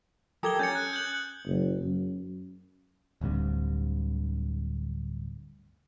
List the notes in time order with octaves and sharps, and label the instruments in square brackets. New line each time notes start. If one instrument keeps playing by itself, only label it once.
[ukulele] G4 A4 A#4 [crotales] D#6 G#6 G7
[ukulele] C#4 [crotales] G6 A6 C#7
[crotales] F#6
G6 F#7
[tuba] F#1
F#2
[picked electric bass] D1 D2 G2 C3